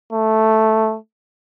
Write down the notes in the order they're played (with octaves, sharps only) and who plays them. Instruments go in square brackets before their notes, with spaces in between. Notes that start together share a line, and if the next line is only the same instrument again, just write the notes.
[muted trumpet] A3